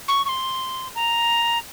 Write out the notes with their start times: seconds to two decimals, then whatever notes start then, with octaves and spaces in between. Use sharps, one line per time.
0.08 C#6
0.25 C#6
0.29 C6
0.95 A#5